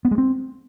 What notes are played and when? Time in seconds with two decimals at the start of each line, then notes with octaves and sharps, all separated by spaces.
0.05 B3
0.11 G#3
0.18 C4